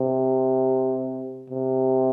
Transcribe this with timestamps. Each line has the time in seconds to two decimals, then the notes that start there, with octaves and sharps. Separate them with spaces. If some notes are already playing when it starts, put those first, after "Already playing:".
Already playing: C3
1.50 C3